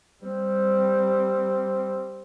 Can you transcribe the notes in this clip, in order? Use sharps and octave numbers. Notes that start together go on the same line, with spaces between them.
G3 C4